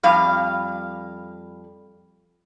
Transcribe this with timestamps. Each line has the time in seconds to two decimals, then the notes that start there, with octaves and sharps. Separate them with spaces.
0.03 F2 G3 F5